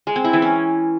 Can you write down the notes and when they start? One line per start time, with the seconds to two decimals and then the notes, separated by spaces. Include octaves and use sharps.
0.07 G#3
0.16 C4
0.24 E4
0.33 E3
0.42 C#4